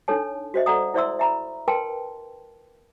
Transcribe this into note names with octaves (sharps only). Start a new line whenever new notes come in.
D4 D#4 A4 C#5 A5
F#4 C5 D#5 E5
A4 D5 F#5 A#5 D#6
E4 C5 D5 E5 C6 E6
E5 A#5 B5
A#4 B4 G5 A5 C6